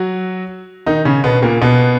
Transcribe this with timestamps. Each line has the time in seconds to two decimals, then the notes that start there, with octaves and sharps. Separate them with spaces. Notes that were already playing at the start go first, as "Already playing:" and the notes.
Already playing: F#3 F#4
0.86 D#3 D#4
1.05 C#3 C#4
1.24 B2 B3
1.42 A#2 A#3
1.62 B2 B3